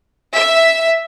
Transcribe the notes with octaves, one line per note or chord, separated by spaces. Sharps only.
E5